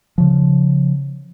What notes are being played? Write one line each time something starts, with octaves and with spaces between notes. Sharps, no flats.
C#3 F3